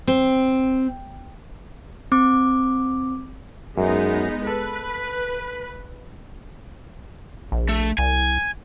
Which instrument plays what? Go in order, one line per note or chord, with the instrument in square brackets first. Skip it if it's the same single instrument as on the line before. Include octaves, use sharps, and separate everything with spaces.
[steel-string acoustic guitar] C4
[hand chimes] C4 D6
[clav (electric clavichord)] F#2 [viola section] G#3 B3 D#4
[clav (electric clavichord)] A4 [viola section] B4
[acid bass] A#1
[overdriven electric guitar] A3
[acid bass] C2 [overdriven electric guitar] G#5